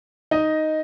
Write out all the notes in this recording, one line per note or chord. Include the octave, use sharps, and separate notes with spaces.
D#4 D#5